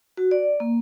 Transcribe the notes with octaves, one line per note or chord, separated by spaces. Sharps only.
F#4
D5
A#3